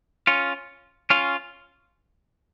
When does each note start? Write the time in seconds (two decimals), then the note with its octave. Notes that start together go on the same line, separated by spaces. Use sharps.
0.27 C#4 F4
1.10 C#4 F4